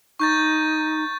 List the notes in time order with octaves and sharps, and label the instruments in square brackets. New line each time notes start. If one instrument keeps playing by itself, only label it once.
[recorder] D#4 [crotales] C#6 G6 A6